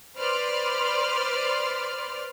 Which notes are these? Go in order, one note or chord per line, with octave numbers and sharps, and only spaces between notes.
B4 C5 D5 C6 F6